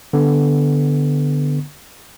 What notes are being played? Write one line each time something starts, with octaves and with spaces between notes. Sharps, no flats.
D3 B3